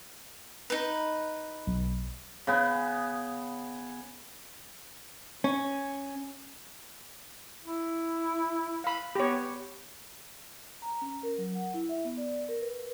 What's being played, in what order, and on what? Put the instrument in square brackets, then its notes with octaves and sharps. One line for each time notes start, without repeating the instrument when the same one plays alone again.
[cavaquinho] D#4 B4
[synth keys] B1
[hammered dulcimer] C#3 B3
[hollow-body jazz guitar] C#4
[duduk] E4
[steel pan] F5 B5
[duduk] B3 [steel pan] G4 C#5
[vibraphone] A#5
C#4
A#4
F#3
F#5
E4
E5
B3
D5
A#4
B4